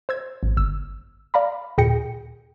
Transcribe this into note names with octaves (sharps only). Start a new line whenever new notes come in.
C5 E6 G#6
A1
G1 E6
D5 F5 A#5 B5
D#2 A#2 G#4 G5 A#6 C#7